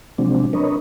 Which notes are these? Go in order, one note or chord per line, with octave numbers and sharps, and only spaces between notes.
C3 F3 F#3 G#3 C4 D4
D4 A#4 B4 C#5 D#5